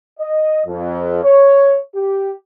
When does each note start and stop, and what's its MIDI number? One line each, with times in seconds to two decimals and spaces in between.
0.19 0.61 75
0.66 1.23 41
1.24 1.79 73
1.95 2.31 67